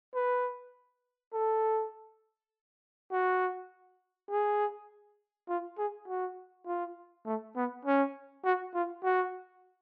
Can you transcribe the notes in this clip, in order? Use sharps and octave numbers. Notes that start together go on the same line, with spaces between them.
B4
A4
F#4
G#4
F4
G#4
F#4
F4
A3
B3
C#4
F#4
F4
F#4